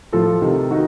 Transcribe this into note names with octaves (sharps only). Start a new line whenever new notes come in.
A2 F3 F4 A4
C3 D#3
D#3 D#4 F#4